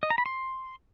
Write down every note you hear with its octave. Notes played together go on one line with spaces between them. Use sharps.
D#5
A#5
B5
C6